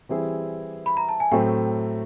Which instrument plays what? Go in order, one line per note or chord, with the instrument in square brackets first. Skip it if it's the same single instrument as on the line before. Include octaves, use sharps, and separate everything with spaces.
[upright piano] E3 G3 C4 E4 G#4
[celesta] B5
A#5
A5
G#5
[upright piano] A2 F#3 A3 C4 [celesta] G5